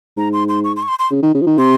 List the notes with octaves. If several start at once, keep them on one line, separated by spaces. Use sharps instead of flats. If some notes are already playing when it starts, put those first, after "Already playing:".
G#2 A#5
C6
C6
C#6
C6
C#6
C6
C6
C#3
D#3
C#3
F3
D#3
C3 C6